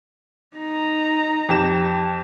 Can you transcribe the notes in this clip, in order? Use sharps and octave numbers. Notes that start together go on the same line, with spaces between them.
D#4 A#5
F2 G4 E7